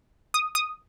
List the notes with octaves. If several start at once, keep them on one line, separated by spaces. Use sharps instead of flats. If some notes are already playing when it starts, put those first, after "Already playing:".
D#6
D#6